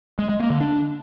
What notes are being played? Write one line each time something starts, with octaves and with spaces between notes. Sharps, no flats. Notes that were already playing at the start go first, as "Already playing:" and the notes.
G#3
G#3
A#3
D3
D4